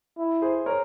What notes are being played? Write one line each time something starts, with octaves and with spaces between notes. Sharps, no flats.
E4
G#4 C5
A#4 C#5